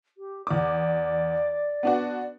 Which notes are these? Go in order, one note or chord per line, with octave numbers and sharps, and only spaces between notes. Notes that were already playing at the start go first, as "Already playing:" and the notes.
G4
E2 D5 D6
B3 D4 F#4